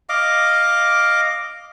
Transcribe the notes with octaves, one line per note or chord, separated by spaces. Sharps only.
D#5 F5 D6